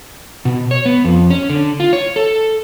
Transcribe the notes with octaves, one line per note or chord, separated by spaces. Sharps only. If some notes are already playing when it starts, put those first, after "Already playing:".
B2
C#5
B3
F2
C#4
D3
F4
C#5
A4